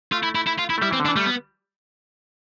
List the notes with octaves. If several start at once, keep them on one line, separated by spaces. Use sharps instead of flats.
A3 F4
E4
E4
E4
F4
E4
A3
G3 E4
E3 C4
D3
D4
E3
G3 A3
B3